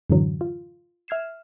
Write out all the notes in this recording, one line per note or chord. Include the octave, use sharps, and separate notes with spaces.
F#2 A2 D3 E3 F#3
F4
E5 F6 G#6 C7 E7